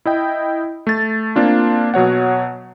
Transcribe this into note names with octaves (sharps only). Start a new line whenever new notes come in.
E4 D#5 G5
A3 A6
A#3 C4 D4 F4
B2 F#3 C#5 F#5